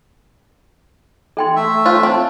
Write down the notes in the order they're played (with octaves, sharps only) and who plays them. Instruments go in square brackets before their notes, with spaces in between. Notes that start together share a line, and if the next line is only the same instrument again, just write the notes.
[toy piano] A4 G5 C6
[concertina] A3 E5
[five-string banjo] F4 [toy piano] C5 C#5 F5
[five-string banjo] C4 [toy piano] C5 A5